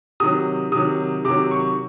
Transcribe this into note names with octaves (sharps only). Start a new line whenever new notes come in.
C3 D#3 F#3 D#6
C3 D#3 F#3 D#6
C3 D#3 F#3 D6
C#6